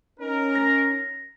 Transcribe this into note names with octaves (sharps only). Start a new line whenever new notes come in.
C#4 D#4 A#4
A#6